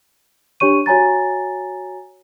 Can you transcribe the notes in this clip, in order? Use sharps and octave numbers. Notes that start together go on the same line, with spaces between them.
D4 G4 C#5 C#6 D#7
F#4 C#5 G#5 A#5 A6